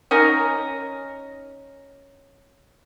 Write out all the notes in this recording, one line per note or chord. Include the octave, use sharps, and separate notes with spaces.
C#4 D#4 A#4